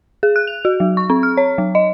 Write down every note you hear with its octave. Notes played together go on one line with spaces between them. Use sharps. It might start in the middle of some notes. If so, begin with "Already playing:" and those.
G#4
F#6
F7
F#4
F#3
C#6
C4
F6
C#5
F#3
D#5